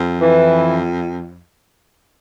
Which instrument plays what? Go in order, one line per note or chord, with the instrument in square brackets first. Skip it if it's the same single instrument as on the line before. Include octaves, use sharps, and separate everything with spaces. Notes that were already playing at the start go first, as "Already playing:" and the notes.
Already playing: [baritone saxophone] F2
[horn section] E3